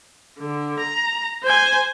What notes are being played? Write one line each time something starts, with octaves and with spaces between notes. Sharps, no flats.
D3
A#5
C5 G#5